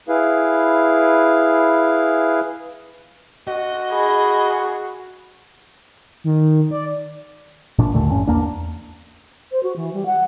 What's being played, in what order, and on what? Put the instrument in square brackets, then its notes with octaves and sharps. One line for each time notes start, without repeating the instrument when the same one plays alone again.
[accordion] E4 G#4 B4 F5
[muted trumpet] F#4 [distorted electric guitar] D#5
[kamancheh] G#4 [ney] B5
[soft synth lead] D#3
D5
[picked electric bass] A1 A#2 D4
D#2 A#2 D3 A3
A1 G2 C#4
E2 A#3 D4
[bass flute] C5
F#4
E3
G3
F#5